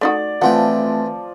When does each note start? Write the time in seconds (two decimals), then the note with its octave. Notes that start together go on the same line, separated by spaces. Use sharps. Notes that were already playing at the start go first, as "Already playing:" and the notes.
0.01 A3 D#4 F#4 D5
0.42 E3 F3 A3 C4 F4 E5 F#5 G5